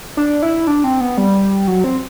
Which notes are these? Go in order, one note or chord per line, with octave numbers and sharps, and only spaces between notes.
D4
E4
D4
C4
B3
G3
F#3
C4